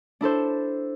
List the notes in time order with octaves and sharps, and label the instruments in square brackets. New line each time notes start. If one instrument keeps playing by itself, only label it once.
[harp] D4 E4 A4 C5